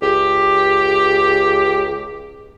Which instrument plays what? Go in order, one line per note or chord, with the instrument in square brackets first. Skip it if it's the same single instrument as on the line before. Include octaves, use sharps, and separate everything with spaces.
[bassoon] C#2 [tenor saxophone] G4